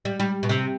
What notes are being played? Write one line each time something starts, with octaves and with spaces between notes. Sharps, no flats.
G3
G3
B2
C3